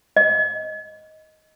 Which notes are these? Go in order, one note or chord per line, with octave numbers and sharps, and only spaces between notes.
D#5